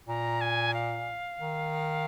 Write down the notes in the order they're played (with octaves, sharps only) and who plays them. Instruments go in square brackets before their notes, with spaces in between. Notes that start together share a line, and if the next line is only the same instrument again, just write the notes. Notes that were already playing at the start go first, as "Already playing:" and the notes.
[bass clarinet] A#2 [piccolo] A#5
[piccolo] G#5
F5
[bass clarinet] D#3